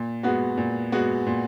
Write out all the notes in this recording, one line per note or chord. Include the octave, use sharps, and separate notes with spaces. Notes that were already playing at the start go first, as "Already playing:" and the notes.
Already playing: A#2
G#3 B3 F#4
A#2
G#3 B3 F#4
A#2